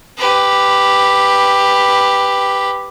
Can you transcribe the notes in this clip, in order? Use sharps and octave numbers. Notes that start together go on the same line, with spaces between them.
G4 B4